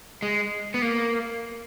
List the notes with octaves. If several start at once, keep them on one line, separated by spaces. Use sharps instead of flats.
G#3
B3
A#3